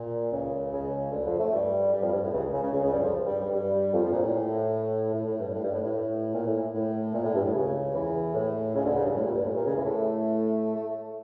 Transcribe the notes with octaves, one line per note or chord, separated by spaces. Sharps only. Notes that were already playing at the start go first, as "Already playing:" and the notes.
Already playing: A#2
C#2 C#3
C#2 C#3
D2 D3
F2 F3
A2 A3
G2 G3
G2 G3
F2 F3
G2
A2
C#2 C#3
C#2 C#3
C#2 C#3
C#2 C#3
C#2 C#3
G2 G3
F2 F3
G2 G3
G2 G3
G2 G3
F2 F3
F2 F3
A#2
A2
A2
A2
G2
A2
G2
A2
A2
A#2
A2
A2
A#2
A2
G2
A2
C#2 C#3
E2 E3
A2
C#2 C#3
D2 D3
C#2 C#3
G2
A2
A#2
G2
A2
A#2
C#2 C#3
E2 E3
A2 A3
A3